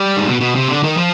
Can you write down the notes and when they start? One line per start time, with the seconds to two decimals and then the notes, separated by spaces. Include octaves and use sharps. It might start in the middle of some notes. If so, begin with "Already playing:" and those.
Already playing: G3
0.17 G#2
0.27 B2
0.41 B2
0.55 C3
0.69 D3
0.83 D#3
0.97 F3